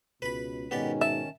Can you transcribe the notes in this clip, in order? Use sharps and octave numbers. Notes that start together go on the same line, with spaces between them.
C#2 B2 B4 B5
G#2 B2 D#3 B3 C#4 D#4 G4 D5
E5 A5